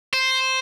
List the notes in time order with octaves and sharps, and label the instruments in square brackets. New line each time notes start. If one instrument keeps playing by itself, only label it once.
[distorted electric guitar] C5